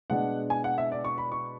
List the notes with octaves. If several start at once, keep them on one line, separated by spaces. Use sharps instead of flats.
B2 G#3 D4 F#5
G#5
F#5
E5
D5
C#6
B5
C#6